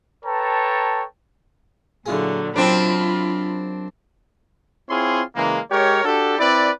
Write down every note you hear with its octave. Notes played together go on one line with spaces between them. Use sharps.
A4 B4 C#5 G5 A5 A#5
A#2 D3 F#3 E4 F4 G#4
F#2 C3 C4 D4 F4 B5
C4 E4 F4 G#4 C#5 C6
C#3 E3 G#3 A#3
G#3 G4 A#4 C#5
D4 F#4 G4 A4
C4 E4 B4 D5